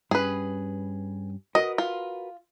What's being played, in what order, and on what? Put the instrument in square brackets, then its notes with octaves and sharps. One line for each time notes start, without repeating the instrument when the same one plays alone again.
[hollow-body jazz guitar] G2 C#4 [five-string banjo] G#4 B4
[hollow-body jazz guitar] F#4 A#4 B4 [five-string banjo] D#5
[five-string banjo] F4